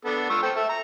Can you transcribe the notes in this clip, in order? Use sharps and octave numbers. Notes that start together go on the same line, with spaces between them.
B3 D4 A4
F4 C#6 E6
A4 C5 G5
A4 E5
A#5